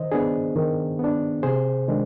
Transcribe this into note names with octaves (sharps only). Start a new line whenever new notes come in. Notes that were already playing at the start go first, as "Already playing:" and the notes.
Already playing: D#3 C5 D#5
B3 D4 G#4
D#3
B3 D4
C3 G#4 C5
D#3 G#3 D4